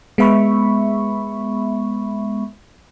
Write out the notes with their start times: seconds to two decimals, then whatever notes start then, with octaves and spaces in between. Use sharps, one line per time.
0.18 G#3 B3 E5 B5 C#6